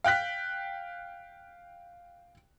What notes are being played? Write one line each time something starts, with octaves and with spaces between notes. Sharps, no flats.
F5 G5 F#6 B6